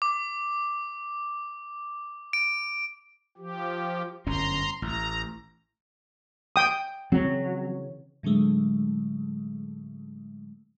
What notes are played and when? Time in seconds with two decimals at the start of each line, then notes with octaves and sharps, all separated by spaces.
0.02 D6
2.33 D7
3.38 F3 G4
4.27 G1 F#2 C#4 A#5 C6
4.82 A1 A#5
6.56 G5 D#6
7.12 C#3 E3 F#3 C4 C#5
8.23 A2 D3 F#3 G#3 A3